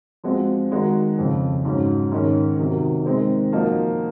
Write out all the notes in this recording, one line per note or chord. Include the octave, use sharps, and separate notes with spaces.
F3 G#3 C4 F#4
D#3 G#3 D#4 F#4
F2 C#3 F3
G#2 F#3 C#4
G#2 D#3 G#3 C#4
C3 D#3 F#3
D#3 G#3 C4
F3 A#3 D#4 F#4